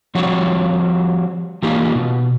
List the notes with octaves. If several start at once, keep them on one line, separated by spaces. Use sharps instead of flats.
F3 G3 C4 F#4 C#5
E3 A#3 D#4 F4 G4
B2